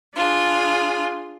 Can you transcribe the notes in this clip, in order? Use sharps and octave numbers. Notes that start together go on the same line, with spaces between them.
D4 F4 G#4